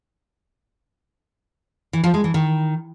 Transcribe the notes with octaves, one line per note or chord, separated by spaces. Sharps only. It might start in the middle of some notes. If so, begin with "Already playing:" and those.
E3
F3
G#3
E3
D#3